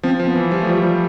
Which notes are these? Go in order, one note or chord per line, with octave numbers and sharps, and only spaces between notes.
F3 C4
F3
B3
E3
F3 G3
A3
F3 G3
F3 G3